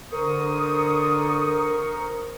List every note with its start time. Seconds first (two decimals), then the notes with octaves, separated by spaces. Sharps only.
0.12 D3 A#4 C5 C#6 D#6